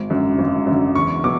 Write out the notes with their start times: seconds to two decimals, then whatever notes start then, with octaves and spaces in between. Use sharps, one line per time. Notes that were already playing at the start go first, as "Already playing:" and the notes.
Already playing: G#1
0.10 F#2 D3
0.38 G#1
0.67 F#2 D3
0.95 E2 C#6
1.24 B2 F#3 D6